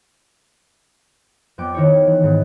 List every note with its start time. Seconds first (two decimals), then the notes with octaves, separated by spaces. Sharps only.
1.58 F2 B3 G5 D6
1.74 D#3 E4 G4 C#5
2.07 E3
2.23 G#2 B3